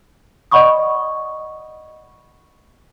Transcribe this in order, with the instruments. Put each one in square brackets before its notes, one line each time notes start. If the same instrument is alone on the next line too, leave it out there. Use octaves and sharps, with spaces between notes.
[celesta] D5 D#5 F#5 B5 C#6 D#6